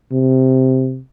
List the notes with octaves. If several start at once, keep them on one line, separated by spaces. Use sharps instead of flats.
C3